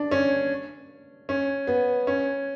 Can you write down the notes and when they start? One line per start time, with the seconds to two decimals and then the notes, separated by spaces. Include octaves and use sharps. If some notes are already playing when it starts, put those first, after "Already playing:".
Already playing: D4
0.11 C#4
1.29 C#4
1.67 B3
2.07 C#4